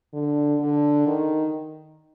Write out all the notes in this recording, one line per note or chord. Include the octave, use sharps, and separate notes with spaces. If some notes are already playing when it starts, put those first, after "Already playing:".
D3
D3
D#3